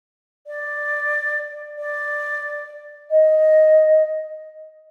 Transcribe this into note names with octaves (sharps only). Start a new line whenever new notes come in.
D5
D5
D#5